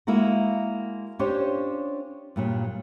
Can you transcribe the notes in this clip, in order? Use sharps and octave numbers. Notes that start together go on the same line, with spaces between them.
G#3 A#3 E4 F#4 A#4
C#4 D4 F4 G4 C5 C#5
G2 A#2 F#3